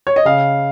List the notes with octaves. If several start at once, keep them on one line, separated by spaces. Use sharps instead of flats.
C#5
D#5
C#3 F5